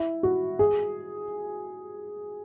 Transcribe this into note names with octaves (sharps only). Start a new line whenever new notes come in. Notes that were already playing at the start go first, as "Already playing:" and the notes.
Already playing: E4
F#4
G#4